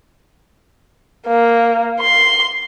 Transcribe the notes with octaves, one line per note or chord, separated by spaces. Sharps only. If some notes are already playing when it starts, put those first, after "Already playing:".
A#3
C6